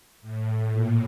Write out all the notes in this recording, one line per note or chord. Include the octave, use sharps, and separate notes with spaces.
A2
A#2